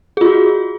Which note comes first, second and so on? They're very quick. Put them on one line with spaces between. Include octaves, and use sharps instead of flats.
G#4 F4 F#4